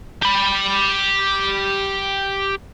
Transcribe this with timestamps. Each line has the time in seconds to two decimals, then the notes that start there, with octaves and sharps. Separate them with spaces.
0.23 G4 B5